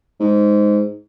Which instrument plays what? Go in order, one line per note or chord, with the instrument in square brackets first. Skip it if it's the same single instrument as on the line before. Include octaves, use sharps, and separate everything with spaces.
[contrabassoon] G#2